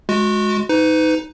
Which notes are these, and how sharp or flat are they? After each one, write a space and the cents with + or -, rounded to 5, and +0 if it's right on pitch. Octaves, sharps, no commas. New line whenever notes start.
G#3 +15 F#4 -25
D#4 +15 B4 +35